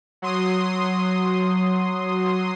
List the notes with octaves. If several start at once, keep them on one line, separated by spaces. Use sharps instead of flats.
F#3 C6 D#6